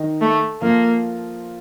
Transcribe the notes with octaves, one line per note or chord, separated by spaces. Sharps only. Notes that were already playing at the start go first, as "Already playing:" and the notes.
Already playing: D#3 D#4
A3
F3 A#3 F4